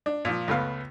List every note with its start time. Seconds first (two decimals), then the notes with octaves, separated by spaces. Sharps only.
0.06 D4
0.25 A#2 F3
0.48 C#2 A3 B3 F5